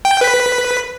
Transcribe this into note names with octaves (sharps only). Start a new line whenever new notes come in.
G5
B4 B6